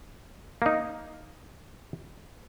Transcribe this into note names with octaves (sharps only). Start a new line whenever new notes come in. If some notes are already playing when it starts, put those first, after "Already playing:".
A#3 D#4